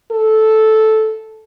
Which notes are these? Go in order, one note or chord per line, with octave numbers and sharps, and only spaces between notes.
A4